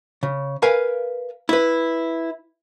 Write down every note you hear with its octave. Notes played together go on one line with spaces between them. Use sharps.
C#3
A#4 B4 F5 G#5
E4 B4